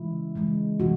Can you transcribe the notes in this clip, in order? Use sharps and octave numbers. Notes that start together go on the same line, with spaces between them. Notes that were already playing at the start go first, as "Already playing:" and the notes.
Already playing: C#3 E3 G#3 E4
C#3 E3 G#3
C3 E3 G3 F#4